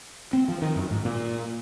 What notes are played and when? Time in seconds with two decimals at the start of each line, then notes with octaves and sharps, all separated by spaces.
0.33 C4
0.48 F3
0.62 D#3
0.76 F#2
0.91 G#2
1.05 A#2